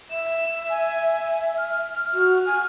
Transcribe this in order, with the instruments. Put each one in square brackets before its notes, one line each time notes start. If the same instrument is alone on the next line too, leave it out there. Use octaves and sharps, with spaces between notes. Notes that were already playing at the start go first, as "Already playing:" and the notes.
[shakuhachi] E5 [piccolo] E7
[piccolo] G#5
F6
[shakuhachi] F#4 [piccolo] F6
[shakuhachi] G#5